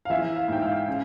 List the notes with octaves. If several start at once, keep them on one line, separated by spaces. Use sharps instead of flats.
F5
E3 E5
F5
G#2 G5
F5
C#3